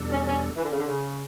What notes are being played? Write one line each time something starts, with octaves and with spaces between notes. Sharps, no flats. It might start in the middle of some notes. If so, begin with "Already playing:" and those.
Already playing: E2 B2 G3 D4 A4
C#4
C#4
E3
D3
C#3
D3
C#3